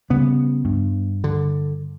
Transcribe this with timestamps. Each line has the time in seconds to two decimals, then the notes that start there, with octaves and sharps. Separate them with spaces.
0.10 C#3 G3 B3
0.65 G2
1.24 D3